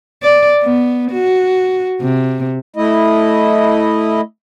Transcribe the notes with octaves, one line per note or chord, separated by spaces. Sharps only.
D5
B3
F#4
C3
A3 E4 D#5